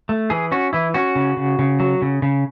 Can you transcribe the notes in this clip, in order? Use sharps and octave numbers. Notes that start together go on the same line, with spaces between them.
A3
E3 G#4
C#4 F#4
E3 E4
C#4 F#4
C#3
C#3
C#3
F#3
C#3
C#3